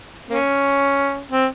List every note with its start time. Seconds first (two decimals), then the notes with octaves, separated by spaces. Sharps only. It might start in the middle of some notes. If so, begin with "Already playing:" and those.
0.30 A#3 C#4
1.31 C4